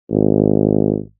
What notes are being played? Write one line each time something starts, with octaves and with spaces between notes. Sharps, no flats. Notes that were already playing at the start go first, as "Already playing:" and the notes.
G#1